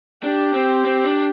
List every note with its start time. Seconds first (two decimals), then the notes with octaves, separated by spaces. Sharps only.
0.24 D4 G4
0.54 C4
0.85 C4
1.04 D4